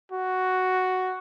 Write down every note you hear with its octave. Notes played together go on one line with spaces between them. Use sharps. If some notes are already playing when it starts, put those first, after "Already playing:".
F#4